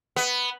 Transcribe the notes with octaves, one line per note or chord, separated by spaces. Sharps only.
B3